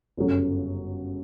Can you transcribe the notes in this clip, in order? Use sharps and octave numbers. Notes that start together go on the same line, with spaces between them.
G1 F#2 C#3 F#3